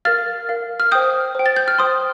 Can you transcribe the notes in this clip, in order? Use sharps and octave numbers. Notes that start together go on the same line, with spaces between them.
A#4 F5 F6 A6
A#4 F5
F6
C5 G5 D#6 G6
C5 G5
A6
G6
F6
C5 G5 C6 D#6